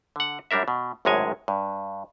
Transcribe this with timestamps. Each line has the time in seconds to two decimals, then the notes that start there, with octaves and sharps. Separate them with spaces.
0.16 D3 F#5
0.51 F#2 G3 D4 A#4 E5
0.68 B2
1.05 G#1 F#2 A2 G#3 C#5 G#5
1.48 G2